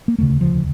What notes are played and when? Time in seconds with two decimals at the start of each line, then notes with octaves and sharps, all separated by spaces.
0.08 A#3
0.18 E1 D2 C#3 A3
0.41 F3